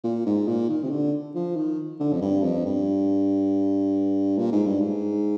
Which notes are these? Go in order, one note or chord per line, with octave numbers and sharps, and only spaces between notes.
A#2
G#2
A#2
D#3
C3
D3
F3
D#3
D3
F2
G2
F2
G2
A#2
G#2
G2
G#2